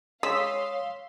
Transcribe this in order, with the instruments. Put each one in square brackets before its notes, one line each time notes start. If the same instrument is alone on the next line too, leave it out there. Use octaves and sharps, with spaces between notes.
[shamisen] G#3 [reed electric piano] C#5 D#6 [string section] F5 C6 [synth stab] E6 B6